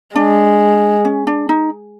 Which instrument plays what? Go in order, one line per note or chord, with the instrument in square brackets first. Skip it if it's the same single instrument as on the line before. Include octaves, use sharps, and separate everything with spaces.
[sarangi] G#3 [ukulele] D4
[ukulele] C#4
D4
D#4